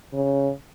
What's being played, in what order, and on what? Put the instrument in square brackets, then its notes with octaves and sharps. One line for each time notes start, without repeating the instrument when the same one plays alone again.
[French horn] C#3